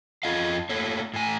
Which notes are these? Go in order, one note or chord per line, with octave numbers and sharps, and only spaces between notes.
F2 F4 D#5 F5
A3 A#3 C#5
A2 G#5